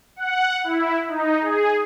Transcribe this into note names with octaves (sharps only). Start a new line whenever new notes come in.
F#5
E4
D#4
G#4